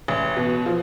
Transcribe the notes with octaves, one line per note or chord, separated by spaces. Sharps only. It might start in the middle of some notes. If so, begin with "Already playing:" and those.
A1
B2
F3